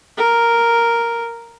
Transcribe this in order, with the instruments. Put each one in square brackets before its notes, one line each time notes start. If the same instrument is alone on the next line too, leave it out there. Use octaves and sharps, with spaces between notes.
[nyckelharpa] A#4